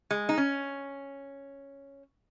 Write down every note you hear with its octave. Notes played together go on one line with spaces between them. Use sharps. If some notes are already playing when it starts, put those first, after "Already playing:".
G#3
D#4
C#4